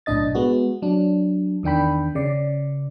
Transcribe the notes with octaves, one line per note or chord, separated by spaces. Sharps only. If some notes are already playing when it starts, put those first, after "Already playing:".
B1 A2 D4 D#5 A6
G#3 B3 F#4
F#3 D4
E2 D#3 D4 G5 B5
C#3 D5